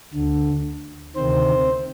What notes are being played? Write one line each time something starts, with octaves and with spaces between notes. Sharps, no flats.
D2 D3
D2 C3 D#3 C4 C5